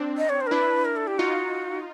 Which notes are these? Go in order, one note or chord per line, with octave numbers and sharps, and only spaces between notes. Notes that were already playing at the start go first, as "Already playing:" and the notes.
Already playing: C4 D4
D#5
C#5
C5
A#4
D4 E4 B4
A#4
A4
G4
D#4 F4 F#4